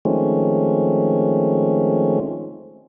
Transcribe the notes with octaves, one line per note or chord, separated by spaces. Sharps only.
D#3 F3 G#3 A3 C4 C#4